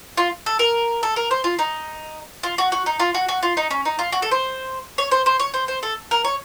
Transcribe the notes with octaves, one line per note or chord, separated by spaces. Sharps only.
F4
A4
A#4
A4
A#4
C5
F4
D#4
F4
F#4
F#4
D#4
F4
F#4
F#4
F4
D#4
C#4
D#4
F4
F#4
A4
C5
C#5
C5
C5
C#5
C5
C5
A4
A#4
C#5